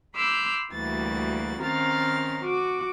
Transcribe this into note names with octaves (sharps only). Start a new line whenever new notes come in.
B5 C6 D6 E6 F6 G6
D2 E3 G3 A#3 F#4 A6
D#3 C4 C#4 F5 A#5 A6
F#4 D6